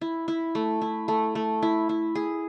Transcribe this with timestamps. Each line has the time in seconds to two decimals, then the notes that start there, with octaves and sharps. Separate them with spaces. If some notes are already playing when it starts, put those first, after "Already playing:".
0.01 E4
0.28 E4
0.55 A3
0.82 E4
1.08 A3
1.35 A3
1.62 E4
1.89 E4
2.15 G#4